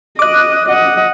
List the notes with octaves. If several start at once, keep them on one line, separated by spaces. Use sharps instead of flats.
D#5 D6 F#6
D#5 F#5